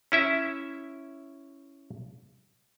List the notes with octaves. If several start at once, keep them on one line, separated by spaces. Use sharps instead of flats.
C#4 E4 E5